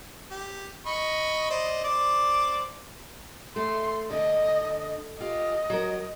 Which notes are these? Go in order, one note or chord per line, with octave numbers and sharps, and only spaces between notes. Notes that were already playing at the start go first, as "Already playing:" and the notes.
G4
D#5 B5 C#6
C5 D5 D#5
C5 D5 D6
A3 C6
D3 D#5
F4 G4 D#5
F#3 A#4